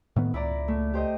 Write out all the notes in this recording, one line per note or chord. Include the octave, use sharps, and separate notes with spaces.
A2 D#3 B3
C#2 E4 D5 A#5
A3
G4 C5 D#5